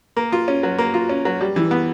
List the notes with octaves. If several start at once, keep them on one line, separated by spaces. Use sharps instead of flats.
A#3
F4
C#4
F#3
A#3
F4
C#4
F#3
G3
E3
B3